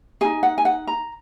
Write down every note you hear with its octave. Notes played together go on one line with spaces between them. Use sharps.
D#4 G#4 G#5
F#5
G#5
F#5
A#5